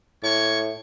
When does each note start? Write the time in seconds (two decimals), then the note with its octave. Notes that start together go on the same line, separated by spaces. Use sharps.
0.23 A2 A#3 C#5 C#6